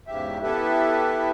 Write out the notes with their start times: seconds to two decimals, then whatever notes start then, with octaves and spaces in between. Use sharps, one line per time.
0.07 E2 G#2 C#3 G4 E5
0.43 B3 E4 G4 A4 B4 E5